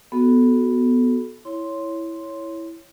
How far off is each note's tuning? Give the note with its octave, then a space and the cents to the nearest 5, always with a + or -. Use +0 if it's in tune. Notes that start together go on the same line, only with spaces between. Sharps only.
B3 +0 F#4 +0 A4 -20
E4 +0 C#5 +0 C6 +0